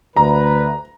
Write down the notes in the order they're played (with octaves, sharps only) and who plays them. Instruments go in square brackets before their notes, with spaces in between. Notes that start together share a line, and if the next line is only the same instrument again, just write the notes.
[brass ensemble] D2 B4 [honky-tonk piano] A#5